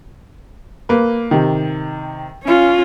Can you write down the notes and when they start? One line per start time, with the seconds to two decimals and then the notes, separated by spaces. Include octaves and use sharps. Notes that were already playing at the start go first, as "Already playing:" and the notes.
0.89 A#3 B4
1.31 C3 D#3
2.44 C#4 F4